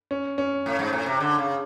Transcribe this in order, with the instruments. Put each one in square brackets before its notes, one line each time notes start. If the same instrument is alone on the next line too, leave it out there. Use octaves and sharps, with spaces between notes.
[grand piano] C#4
C#4
[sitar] A2
G#2
A2
C3
D3
C#3